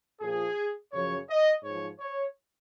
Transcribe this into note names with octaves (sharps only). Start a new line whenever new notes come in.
A#2 F3 G#4
F#2 C#3 F3 C#5
D#5
G#2 F3 C#5
C#5